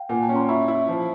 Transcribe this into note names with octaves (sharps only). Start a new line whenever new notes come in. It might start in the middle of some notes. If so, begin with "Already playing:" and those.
Already playing: F5 G5
A#2 F#5 G#5
G5 A5
C#4
A#5 C6
E4 B5 C#6
E4
F3